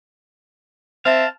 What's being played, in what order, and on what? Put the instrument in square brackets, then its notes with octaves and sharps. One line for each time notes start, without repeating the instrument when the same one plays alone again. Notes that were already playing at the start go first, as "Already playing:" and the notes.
[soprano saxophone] C4 [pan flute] E5 [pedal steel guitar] F5 A5